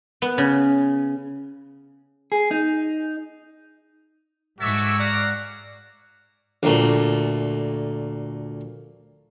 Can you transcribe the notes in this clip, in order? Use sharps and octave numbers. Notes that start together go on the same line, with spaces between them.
B3
C#3
G#4
D#4
G#2 F#4 A4 C#5 E5 D6 E6 B6
D5 F5 F#5 A#5
D2 A#2 A3